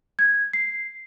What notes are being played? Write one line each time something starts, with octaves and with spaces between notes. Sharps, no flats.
G#6
C7